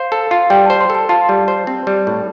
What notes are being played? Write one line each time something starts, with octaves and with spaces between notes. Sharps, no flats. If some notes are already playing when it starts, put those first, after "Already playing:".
Already playing: C5 F5
A4
F4
G3 G5
C5 A5
C6
A4
A5
F4 A5
G3
C5
C4
G3
A2